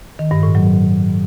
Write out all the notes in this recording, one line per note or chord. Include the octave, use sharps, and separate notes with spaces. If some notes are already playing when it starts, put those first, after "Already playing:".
D#3
G2
A2
F#3